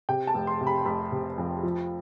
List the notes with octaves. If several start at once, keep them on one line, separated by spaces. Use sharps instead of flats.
C3 G5
A5
F1
C6
C3
B5
F1 B5
C3
F2
F3